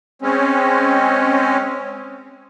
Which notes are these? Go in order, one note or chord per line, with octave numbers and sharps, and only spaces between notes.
G#3 C4 C#4